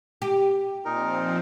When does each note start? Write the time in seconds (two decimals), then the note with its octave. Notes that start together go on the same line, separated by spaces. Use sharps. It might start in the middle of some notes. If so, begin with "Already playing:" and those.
0.22 G4
0.85 A#2 F3 C4 D#4 A#4